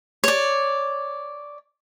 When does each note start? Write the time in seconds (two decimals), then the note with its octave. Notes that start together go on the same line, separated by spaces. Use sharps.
0.24 C#5 D5